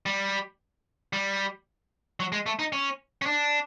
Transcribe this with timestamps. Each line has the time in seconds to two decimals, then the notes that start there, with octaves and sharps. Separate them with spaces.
0.06 G3
1.13 G3
2.20 F#3
2.32 G#3
2.46 A3
2.59 D#4
2.73 C#4
3.22 C#4
3.26 D4